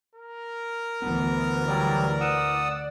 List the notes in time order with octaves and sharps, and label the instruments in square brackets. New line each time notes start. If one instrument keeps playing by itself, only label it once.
[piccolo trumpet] A#4
[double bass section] D2 E3 [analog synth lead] B3
[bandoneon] F#3 G3 [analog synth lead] D5
[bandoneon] F#5 D#6 E6